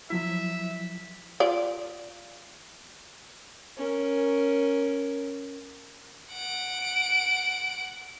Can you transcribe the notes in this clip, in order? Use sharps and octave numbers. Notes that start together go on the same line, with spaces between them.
F3 F#3 E4 E5
F4 D5
C#4 A#4
F#5 D7